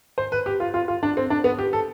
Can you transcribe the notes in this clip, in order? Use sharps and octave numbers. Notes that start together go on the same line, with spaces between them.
C5
B4
G4
F4
F4
F4
D4
C4
D4
B3
G4
A4